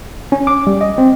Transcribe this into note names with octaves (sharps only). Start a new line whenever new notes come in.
C#4
D6
G3
D#5
C4